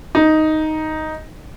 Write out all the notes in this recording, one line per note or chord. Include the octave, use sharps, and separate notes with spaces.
D#4